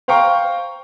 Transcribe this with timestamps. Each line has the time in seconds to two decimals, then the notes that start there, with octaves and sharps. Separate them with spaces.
0.08 C5 F5 G5 A#5 C#6